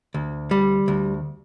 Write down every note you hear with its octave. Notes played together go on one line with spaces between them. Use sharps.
D2
G3
D2